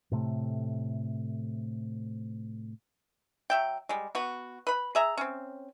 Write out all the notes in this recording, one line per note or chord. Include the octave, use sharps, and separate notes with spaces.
A2 C3 A3
F#3 E5 G5
G3 G#3
B3 F#4
B4 B5
G#4 E5 A#5
C4 C#4